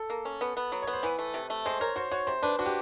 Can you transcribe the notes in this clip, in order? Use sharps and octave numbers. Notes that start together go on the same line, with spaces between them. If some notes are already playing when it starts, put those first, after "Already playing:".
Already playing: A4
A#3
C#4
B3
B3
F#3
B3 C#5
C5
E3 B4
A3
C3
A3
G#3 C5
A#4 C#5
F#4 C5
F#4 C#5
C3 C5
D4 B4
D4 F#4
G4